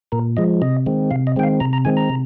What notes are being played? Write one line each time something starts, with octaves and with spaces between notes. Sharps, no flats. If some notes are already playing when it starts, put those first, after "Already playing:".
A#2 A#4
F3 G#3 D#5
C3 D#5
D#3 G#3 C4
C3 F5
D#5
D#3 G#3 C4 G5
F5
C3 A#5
A#5
D#3 G#3 C4 G#5
A#5
C3